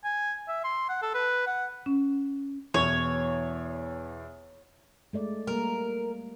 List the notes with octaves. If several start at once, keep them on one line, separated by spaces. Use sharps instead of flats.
G#5
E5
C6
F#5
A4
B4
F#5
C#4
E2 B2 C#5
G#3 A3 D5
G3 A#3 A#4